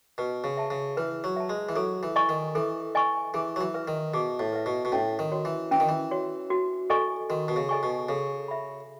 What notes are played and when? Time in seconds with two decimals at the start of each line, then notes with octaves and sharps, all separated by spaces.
0.18 B2 B4
0.44 C#3
0.57 E5 A5
0.70 C#3
0.97 E3 B4
1.24 F#3
1.36 E5 A5
1.49 G#3
1.69 E3
1.76 F#3 A4
2.03 E3
2.16 D#5 G#5 C#6
2.29 D#3
2.55 E3 A4
2.95 D#5 G#5 C#6
3.34 E3 G#4
3.56 F#3
3.61 E3
3.74 B4 E5
3.88 D#3
4.14 B2 G#4
4.39 A2
4.53 B4 E5
4.66 B2
4.85 B2
4.92 A2 C#4
5.19 D#3
5.32 F#4 C#5
5.45 E3
5.71 E3 C#4
5.80 D#3
5.89 E3
6.11 F#4 C#5
6.50 F#4
6.90 A4 D#5 G#5 C#6
7.30 D#3 F#4
7.48 B2
7.56 C#3
7.69 A4 D#5 G#5 C#6
7.83 B2
8.09 C#3 A4
8.48 E5 B5